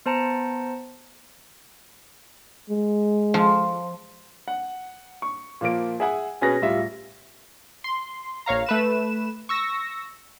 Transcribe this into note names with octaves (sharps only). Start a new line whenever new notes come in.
B3 C5 A5 A#5 C#7
G#3
F3
F#5
C#6
A#2 F3 A#3 D7
G#4 E5 F#5 G#5
B2 C#4 G#4 B4 A#6
D1 G3 F4 E5
C6
A#1 C#5 F5 A#5
A3 B4 E7
C#6 E6 A#6